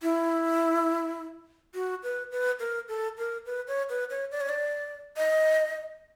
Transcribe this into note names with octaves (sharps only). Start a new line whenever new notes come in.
E4
F#4
B4
B4
A#4
A4
A#4
B4
C#5
B4
C#5
D5
C#5
D5
D#5